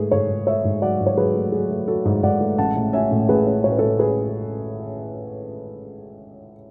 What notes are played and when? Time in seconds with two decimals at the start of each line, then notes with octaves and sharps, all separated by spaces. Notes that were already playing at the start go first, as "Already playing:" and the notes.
Already playing: G#2 A3 G#4 B4
0.11 G#2 A4 C#5
0.29 G#2
0.47 A3 C#5 E5
0.65 G#2
0.82 F#3 D5 F#5
1.00 G#2
1.06 C#5
1.17 F#3 G#4 B4
1.35 A3
1.52 F#3 G#4
1.70 A3
1.88 A3 F#4 A4
2.05 G#2
2.23 G#2 D5 F#5
2.41 A3
2.58 A1 F#5 A5
2.76 A2
2.93 C#4 E5 G#5
3.11 A2
3.29 A1 G#4 B4
3.47 C#4
3.64 A2 C#5
3.72 B4
3.78 A2 A4 C#5
3.99 C#4 G#4 B4